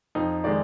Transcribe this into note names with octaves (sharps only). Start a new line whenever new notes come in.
F2 D#4
D#3 G#3 D5